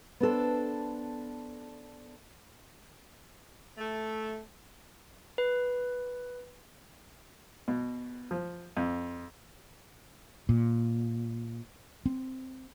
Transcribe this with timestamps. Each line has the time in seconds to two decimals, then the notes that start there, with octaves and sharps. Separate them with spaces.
0.20 B3 D4 A4 C5
3.77 A3
5.38 B4
7.68 B2
8.31 F3
8.77 F2
10.49 A#2
12.06 C4